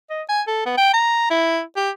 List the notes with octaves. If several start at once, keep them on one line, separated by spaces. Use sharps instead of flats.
D#5
G#5
A4
B3
G5
A#5
E4
G4